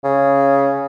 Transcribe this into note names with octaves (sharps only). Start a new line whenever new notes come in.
C#3